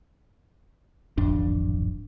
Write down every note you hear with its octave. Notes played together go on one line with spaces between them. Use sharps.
D1 G#1 F2 D4